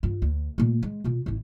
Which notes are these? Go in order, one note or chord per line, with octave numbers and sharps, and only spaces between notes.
G2 F4
D2
A#2 A3
G#3
B2 F4
G#1 E4